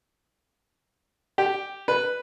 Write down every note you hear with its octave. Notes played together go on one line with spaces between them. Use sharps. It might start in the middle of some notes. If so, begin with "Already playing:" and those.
G4
B4